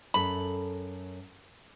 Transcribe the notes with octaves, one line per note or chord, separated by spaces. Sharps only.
F#2 A4 B5